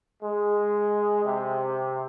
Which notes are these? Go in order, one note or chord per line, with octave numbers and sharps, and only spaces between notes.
G#3
C3